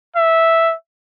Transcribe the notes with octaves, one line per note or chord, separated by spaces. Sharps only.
E5